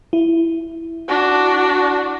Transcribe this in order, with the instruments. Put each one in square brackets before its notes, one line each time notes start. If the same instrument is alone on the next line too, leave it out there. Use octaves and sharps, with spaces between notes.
[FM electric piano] E4
[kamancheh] D4 F#4